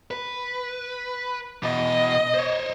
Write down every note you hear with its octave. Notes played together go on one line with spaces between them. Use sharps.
B4
B2 E3 D#5
C5 C#5